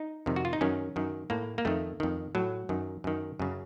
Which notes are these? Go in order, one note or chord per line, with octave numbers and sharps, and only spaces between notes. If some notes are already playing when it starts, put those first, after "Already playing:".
Already playing: D#4
F2 C3 D#3
F#4
F4
D#4
F#2 D#3 C#4
F#2 D#3
A2 A#3
A#3
F2 D#3 A3
F2 D#3
A2 F#3
F#2 D#3
F#2 D#3
F#2 C#3